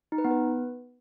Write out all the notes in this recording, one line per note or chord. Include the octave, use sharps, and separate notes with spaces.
D#4
B4
B3
B4